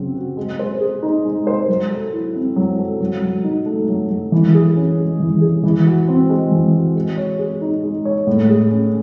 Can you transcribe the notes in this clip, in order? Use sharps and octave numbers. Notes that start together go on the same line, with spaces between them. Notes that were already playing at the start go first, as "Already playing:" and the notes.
Already playing: C#3 F#3 C4
F#4
G#3
C5
G#4
D#4
G#3
C5
F#3
A4
E4
C4
F#3
A4
F#3
F#3
D#4
A3
F#3
F#3
E3
G#4
C#4
G#3
E3
G#4
E3
F#4
C4
G#3
E3
F#4
G#3
C#5
G#4
D#4
G#3
C#5
A2
G#4
C#4